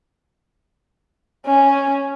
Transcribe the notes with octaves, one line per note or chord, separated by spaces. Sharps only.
C#4